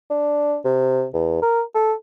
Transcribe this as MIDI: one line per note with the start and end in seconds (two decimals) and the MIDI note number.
0.10 0.57 62
0.65 1.06 48
1.14 1.37 40
1.42 1.62 70
1.75 1.93 69